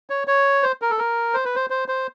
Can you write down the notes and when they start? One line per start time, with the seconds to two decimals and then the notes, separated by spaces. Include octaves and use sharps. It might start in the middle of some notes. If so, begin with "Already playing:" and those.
0.10 C#5
0.27 C#5
0.63 C5
0.82 A#4
0.91 A4
0.98 A#4
1.34 C5
1.45 B4
1.56 C5
1.70 C5
1.88 C5